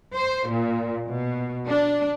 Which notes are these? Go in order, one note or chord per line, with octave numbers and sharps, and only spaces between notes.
C5
A#2
B2
D4